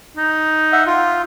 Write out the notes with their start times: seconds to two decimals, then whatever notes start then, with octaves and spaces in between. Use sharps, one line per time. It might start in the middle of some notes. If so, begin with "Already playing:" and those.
0.17 D#4
0.72 E5 F#5
0.87 F4